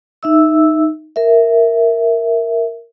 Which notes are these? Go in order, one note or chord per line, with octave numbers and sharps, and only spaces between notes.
D#4 E5 E6
A#4 E5